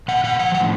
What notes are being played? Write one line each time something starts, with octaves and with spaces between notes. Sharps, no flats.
A#2 F#5
A#2 F#5
F3 F#5
A2 F#5